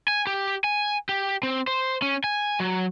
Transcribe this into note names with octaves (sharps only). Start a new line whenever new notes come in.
G#5
G4
G#5
G4
C4
C5
C#4
G#5
F#3